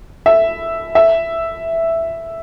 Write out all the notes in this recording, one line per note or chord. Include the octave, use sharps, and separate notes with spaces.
E5
E5